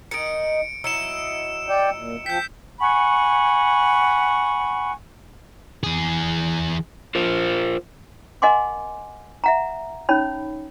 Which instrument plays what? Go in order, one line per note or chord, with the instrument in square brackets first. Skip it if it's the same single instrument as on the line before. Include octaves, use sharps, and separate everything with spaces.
[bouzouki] D#3 D#4 [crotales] C#7 D7
[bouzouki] F#3 D#4 E4 [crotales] E6 C#7 E7
[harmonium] D5 G5
A#2
[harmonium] F3 G5 [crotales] G6 B6
[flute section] F#5 G#5 B5 C#6
[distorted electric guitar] E3 G#4
[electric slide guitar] F4 A#4 C5
[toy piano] A#4 D#5 F#5 G#5 C6 D6
E5 F#5 A#5
C#4 D#4 C#5 B5